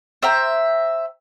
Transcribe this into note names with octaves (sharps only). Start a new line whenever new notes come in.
C5 E5 G5 A#5